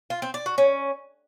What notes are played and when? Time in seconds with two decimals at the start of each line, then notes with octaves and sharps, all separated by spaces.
0.10 F4
0.22 C4
0.34 D5
0.46 F#4
0.58 C#4